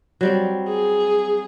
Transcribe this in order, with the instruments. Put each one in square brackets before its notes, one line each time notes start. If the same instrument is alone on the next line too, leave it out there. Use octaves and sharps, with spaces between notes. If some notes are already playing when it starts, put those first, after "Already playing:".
[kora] F#3 G3 C4
[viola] G#4